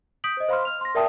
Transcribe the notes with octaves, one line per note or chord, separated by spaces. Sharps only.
D#6 G6 B6 D7 F#7
C5 D#5
C5 F5 B5 C6 F6
F6 F7
C6 A#6
A#4 D5 E5 G5 A5 D#6